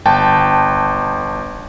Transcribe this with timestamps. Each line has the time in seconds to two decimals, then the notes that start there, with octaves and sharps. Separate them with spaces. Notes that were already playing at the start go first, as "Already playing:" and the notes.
0.06 G1 G5 A5